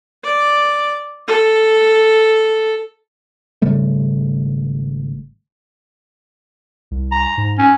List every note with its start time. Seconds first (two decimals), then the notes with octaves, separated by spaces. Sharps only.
0.24 D5
1.28 A4
3.62 G#1 C#3 G3 A3
6.91 C2
7.12 A#5
7.37 G#2
7.58 C#4